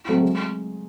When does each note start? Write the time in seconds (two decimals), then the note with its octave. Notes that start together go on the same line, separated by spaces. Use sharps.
0.08 F#3 A3 C4
0.23 G#3